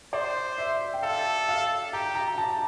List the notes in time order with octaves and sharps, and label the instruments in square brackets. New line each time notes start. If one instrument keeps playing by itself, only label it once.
[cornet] C5 [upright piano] D5
[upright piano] E5
G5
[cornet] A4 [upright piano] F5
[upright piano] F5
[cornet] G4 [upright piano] A#5
[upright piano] A#5
A5